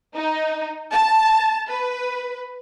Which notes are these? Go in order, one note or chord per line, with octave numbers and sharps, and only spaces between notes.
D#4
A5
B4